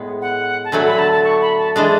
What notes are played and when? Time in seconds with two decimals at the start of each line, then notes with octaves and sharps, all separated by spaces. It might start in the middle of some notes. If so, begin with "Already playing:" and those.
Already playing: A2 G#3 B3
0.22 F#5
0.65 A5
0.72 D3 F#3 A3 G#5
0.87 B5
0.99 A5
1.12 A5
1.24 C#6
1.41 B5
1.59 A5
1.76 E3 G#3 D4 A5